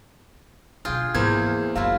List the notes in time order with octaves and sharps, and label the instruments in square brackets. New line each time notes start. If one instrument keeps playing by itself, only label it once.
[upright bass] B2 D3 [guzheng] F4 G#4 G5
[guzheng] E2 C5 [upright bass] G#2 F3 [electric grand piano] A#3 G#6
[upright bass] F#1 D3 [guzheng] F#3 E4 F4 [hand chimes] F5